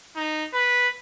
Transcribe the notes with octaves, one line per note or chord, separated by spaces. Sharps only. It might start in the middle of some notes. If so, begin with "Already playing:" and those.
D#4
B4